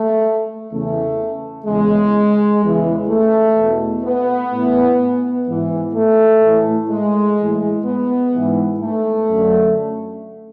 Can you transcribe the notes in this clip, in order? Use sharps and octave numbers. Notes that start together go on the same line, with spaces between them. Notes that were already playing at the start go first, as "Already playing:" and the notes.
Already playing: A3
E2 C#3 E3 A3
E2 C#3 E3 G#3
E2 C#3 E3
A3
E2 B2
B3
A2 E3
G#2 E3
A3
A2 E3
G#3
A2 E3
B3
G#2 E3
A3
F#2 D3